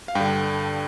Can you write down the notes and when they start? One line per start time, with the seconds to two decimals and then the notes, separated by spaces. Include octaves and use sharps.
0.08 F5
0.15 G2 G5
0.20 D3